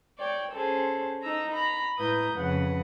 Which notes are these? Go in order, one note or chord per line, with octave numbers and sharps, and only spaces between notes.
C#5 D5 G5
C#4 G#4 A4 C5
D#4 A#5 E6
A#5 B5
A2 E4 B4 A#5 D#6 G6
F2 C#3 B4 F#5